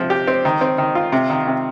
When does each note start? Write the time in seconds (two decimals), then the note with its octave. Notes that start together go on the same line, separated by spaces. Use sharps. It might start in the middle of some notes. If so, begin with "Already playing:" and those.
Already playing: C3 F3
0.10 G4
0.27 C4
0.45 D#3
0.61 C4
0.78 D#3
0.95 F4
1.12 C3
1.30 D#3
1.47 C3